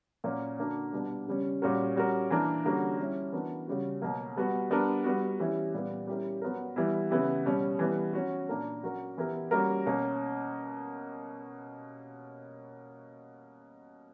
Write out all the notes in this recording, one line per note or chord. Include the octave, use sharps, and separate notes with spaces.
A#2 F#3 A#3 C#4
D3 A#3 D4 F#4
B2 G3 B3 D4
C#3 G3 C#4
A#2 G3 C#4 F#4 A#4
G3 C#4 F#4 A#4
E3 A#3 D4 A#4
D3 G3 A#3 C#4 F#4
G3 C#4 E4
E3 B3 D4 F#4 A#4
C#3 G3 C#4 F#4
B2 F#3 A#3
G3 B3 F#4
G3 B3 D4 A#4
G3 B3 F#4
E3 G3 C#4 E4 G4
A#2 G3 B3
G3 C#4 E4 G4 A#4
F#3 B3 F#4 A#4
E3 G3 B3 E4
C#3 E3 B3 E4 G4
B2 G3 C#4
E3 G3 B3
F#3 C#4 F#4
A#2 A#3 D4 A#4
F#3 C#4 F#4 A#4
E3 B3 E4 G4 A#4
G3 A#3 C#4 F#4 A#4
B2 A#3 C#4